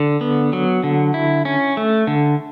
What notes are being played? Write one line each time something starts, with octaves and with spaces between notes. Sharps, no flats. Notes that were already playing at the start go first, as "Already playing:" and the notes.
Already playing: D3
B3
F#3
D3
E4
C#4
A3
D3